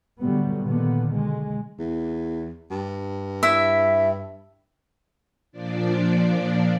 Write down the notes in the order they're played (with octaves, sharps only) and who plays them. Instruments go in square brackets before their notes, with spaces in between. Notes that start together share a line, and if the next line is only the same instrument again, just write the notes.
[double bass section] A2 D3 F#3 G3 B3
A#2 D3 D#3 B3
B1 G#3
[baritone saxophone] E2
G2
[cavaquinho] E4 E5
[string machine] A#2 F3 D4 D5